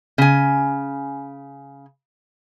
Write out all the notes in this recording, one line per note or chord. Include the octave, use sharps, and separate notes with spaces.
C#3 G#5